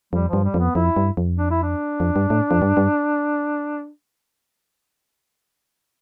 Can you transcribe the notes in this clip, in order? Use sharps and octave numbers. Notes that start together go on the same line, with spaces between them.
F2 G3
G2 F3
G3
F2 B3
F2 E4
G2
F2
D4
E4
D4
F2
G2
A2
F2
G2
G2